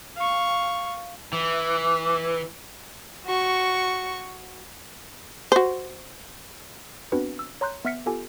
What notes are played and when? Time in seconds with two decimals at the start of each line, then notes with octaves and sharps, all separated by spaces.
0.16 F5 C#6
1.33 E3
3.25 F#4 C#6
5.52 F#4 C5
7.12 B3 C4 D4 F#4 B4
7.39 E6
7.61 C#5 A#5 C6 F#6 G6
7.85 B3 E5 F6 B6 C#7
8.06 B3 F4 G4 A4 G#5